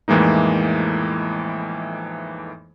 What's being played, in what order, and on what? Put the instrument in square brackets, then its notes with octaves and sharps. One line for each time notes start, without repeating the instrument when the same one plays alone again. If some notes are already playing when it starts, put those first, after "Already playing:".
[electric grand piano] F2 A2 E3 G#3 A#3 D#4